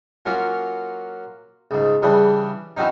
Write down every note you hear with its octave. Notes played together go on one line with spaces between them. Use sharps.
F#3 A#3 C#4 F4
C#2 G#2
C#3 E3 G3 D4
E3 F#3 C4 C#4 D#4